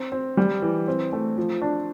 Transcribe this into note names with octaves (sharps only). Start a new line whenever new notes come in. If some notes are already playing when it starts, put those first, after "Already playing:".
Already playing: C4
C4
G3
E3
C4
A3
F3
D4